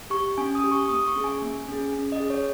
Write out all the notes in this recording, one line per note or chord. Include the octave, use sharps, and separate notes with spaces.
G4 C#6
C#4 G#5
D#6
G4
C#6
A#3 D#6
C#6
C#4 G#4
G#5
A#3
C#4 G#4
C#4
D#5
G#4
C#5